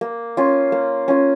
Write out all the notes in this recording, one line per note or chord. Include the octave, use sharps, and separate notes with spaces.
A#3
C#4 F4
A#3
C#4 F4